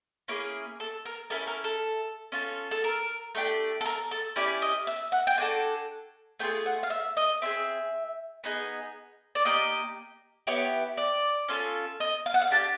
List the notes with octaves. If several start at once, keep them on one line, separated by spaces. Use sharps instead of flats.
A#3 C#4 E4 G#4
A4
A#4
C#4 E4 A4 A#4
A#4
A4
C#4 F4 A4
A4
A#4
A3 D4 G4
A4
A#4
A4
C#4 E4 G4 D5
D#5
E5
F#5
G5
D4 F#4 A4 G#5
A3 D4 F4 G#4 G5
F#5
F5
E5
D#5
C4 F4 G#4 E5
B3 D#4 G#4
D5
A#3 D#4 G4 D#5
B3 E4 G4 C#5
D5
C#4 F4 A4
D#5
F5
F#5
F5
D4 G4 A5